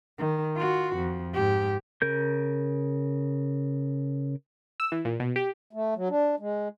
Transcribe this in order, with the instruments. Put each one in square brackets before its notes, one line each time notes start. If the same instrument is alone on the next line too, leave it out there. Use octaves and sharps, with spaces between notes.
[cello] D#3
F4 F#4
F2
G#2 G4
[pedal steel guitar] C#3 A#4 G6
[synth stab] E6
E3
A#2
B2
G4
[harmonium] A3
F#3
D4
G#3